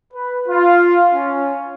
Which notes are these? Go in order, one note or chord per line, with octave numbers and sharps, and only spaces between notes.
B4
F4
C#4